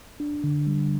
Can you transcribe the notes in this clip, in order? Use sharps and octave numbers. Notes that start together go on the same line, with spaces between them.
D4
D3
G3